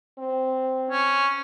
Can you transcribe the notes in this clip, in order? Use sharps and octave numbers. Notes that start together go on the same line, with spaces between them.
C4
C#4